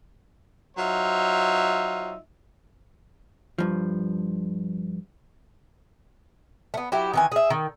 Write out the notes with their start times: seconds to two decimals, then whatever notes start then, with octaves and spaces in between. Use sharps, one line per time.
0.77 F#3 D#4 F4 C5 E5
3.58 G2 F3
6.74 A3 B3
6.92 F#3 E4 G4
7.13 D#3 E3 G#5
7.32 G#4 E5
7.50 D#3